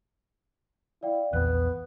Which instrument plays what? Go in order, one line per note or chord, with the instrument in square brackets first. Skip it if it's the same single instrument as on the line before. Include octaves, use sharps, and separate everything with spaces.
[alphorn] E4 [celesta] D5 F5 G5
[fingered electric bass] A#1 E2 [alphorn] B3 [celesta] F#6